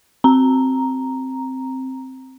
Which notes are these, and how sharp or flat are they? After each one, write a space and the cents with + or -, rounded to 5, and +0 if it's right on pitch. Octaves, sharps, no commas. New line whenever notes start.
C4 +0 A#5 +0